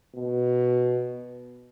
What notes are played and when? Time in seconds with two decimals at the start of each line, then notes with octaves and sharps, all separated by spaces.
0.16 B2